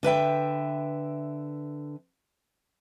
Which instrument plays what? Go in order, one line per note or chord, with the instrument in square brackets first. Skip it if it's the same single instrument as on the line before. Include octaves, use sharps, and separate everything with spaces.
[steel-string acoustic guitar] D3 B4 E5 G5